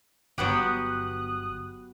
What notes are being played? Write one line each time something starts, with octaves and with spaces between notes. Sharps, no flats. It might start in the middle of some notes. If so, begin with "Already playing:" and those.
G1 F#3 B3 G4 D#6 F#6